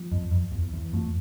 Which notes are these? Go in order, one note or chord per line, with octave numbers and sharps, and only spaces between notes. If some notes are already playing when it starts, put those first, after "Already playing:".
Already playing: F3
F2
F2
E2
E2
F2 A3